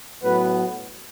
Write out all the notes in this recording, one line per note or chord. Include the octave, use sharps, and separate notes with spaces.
A2 F#3 B3 B4